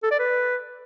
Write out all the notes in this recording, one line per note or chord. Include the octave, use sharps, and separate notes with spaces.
A4
D5
B4